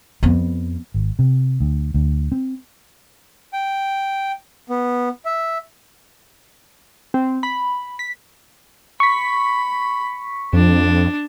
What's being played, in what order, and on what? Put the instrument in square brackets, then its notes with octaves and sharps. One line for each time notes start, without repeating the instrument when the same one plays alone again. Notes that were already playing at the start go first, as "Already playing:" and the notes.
[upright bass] F2 B3
[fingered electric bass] G#1
C3
D2
D2
C4
[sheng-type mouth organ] G5
B3
E5
[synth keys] C4
B5
B6
[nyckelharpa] B5 [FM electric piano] C#6 B6
[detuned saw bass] F2 [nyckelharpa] D4